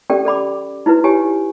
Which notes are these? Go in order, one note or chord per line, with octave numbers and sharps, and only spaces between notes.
C#4 G4 A4 D5 G5
A4 D5 B5 D6
D#4 E4 F#4 B4
G4 C#5 G#5